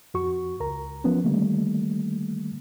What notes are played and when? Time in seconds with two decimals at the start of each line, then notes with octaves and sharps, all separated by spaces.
0.14 F2 F#4 C#6
0.60 C#2 A#4 A#5
1.04 F3 B3 C#4
1.24 D3 D#3 G3 A3 A#3